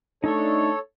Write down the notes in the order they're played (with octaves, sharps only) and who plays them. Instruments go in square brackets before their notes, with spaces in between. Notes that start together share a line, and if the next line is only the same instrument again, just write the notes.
[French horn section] A3 D4 [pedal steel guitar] D#4 C#6 [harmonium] A4 C#5